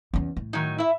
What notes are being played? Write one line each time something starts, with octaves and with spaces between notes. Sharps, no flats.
E2 C#4
A2
D#3 F#3 D#4
E4 E5